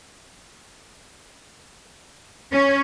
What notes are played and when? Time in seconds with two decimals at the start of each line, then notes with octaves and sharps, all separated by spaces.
2.52 C#4